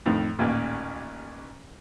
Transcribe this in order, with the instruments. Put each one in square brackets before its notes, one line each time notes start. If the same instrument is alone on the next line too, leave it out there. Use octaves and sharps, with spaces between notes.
[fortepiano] F2 A2 D#3
A1 D#2 A#2